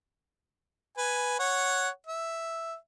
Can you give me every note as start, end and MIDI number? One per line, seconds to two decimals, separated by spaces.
0.98 1.36 71
0.98 1.36 80
1.39 1.89 73
1.39 1.89 78
2.07 2.75 76